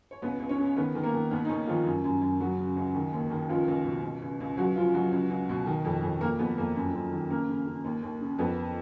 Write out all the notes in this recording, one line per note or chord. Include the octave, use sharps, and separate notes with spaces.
C#5
C#2 B3 B4
C#2
C#4 C#5
C#3
D#3 B3 B4
D#3
A#3 A#4
D#3
D#2 B3
D#4
D#2 C#3 C#4
D#3 F3 F4
F#2
F#2
F#2
C#3 F#3 F#4
C#3
C#2
D#3
D#2
D#3
C#2 F3 F4
C#2
B2
C#2
C#2
C#2
C#2 F#3 F#4
C#3 F3 F4
C#2 F#3 F#4
C#2
C#2
B2
D#3
F2
F2
F2 A#3 A#4
F2 B3 B4
F2 A#3 A#4
F#2
F#2
D#3
C#3 A#3 A#4
C#3
C#3
D#2
D#2
C#3
F2 B3 B4